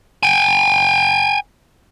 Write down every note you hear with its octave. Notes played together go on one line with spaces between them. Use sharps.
G5 G#5